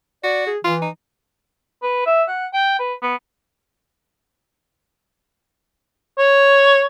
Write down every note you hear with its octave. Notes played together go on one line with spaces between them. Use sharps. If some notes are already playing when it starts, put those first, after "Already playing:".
F#4 D5
G#4
E3 F4
D#4
B4
E5
F#5
G5
B4
B3
C#5